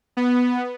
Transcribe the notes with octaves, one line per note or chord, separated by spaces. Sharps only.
B3